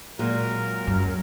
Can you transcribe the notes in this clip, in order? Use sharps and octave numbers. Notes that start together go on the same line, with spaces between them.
A#2 F#3 G#3 A#4
F#2